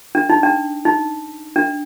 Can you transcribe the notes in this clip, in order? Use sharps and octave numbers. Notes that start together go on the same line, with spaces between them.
D4
D#4
D4
D#4
D4